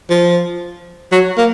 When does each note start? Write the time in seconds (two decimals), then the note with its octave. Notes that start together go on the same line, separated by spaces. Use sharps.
0.10 F3
1.12 F#3
1.38 A#3